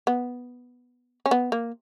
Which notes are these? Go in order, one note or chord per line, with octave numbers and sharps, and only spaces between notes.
B3
C#4
B3
A#3